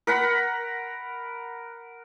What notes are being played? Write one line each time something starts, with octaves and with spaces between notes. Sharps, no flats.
A#4 F#5 B5